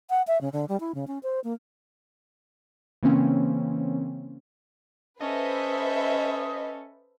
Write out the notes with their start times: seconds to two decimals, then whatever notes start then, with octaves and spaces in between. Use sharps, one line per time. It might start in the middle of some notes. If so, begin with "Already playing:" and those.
0.10 F#5
0.27 E5
0.41 C#3
0.53 D3
0.69 G3
0.80 E4
0.95 C#3
1.07 C#4
1.23 C5
1.44 A#3
3.03 C#3 E3 A#3 C4 C#4
5.20 C#4 A4 B4 C5 D#5 E5